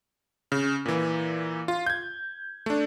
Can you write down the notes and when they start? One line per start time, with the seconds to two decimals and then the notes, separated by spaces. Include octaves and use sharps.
0.52 C#3
0.86 A#2 E3
1.68 F4
1.86 G6 G#6
2.66 A3 D4